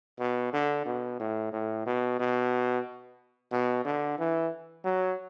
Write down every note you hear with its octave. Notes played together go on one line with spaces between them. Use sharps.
B2
D3
B2
A2
A2
B2
B2
B2
D3
E3
F#3